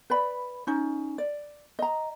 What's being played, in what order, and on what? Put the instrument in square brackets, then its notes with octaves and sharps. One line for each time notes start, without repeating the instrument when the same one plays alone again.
[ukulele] B4 D5 B5
C#4 D#4
D5
D#5 A#5